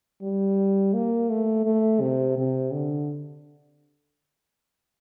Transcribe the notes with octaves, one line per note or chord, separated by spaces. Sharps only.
G3
A#3
A3
A3
C3
C3
D3